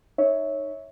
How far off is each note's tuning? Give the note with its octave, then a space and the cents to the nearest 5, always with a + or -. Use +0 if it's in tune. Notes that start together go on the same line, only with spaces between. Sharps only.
D#4 -10 C#5 +0 E5 -20